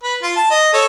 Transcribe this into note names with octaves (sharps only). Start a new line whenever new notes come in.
B4
F4
A5
D#5
A4 C#5